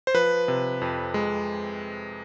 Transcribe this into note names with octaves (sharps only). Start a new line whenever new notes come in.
C5
F3 B4
C3
F2
G#3